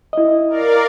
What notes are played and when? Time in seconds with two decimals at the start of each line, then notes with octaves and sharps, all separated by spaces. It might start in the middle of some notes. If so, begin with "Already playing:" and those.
0.13 E4 D#5
0.49 A#4 D5 F5